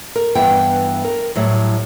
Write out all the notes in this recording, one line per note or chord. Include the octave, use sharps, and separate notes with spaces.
A#4
G2 E3 B3 G5
A#4
A2 F#3 G3